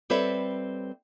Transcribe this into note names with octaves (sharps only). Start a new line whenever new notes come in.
G3 C4 A4 B4 C#5 E5